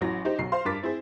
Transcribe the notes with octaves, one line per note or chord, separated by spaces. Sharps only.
A1 E3 F#3 A#6
D#4 G4 C5
B1 F#3 C7
C5 F5 C6
G2 A#4 D6 A6 B6
C4 E4 G#4 C5